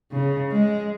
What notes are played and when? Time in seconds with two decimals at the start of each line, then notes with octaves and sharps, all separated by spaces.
0.12 C#3
0.52 G#3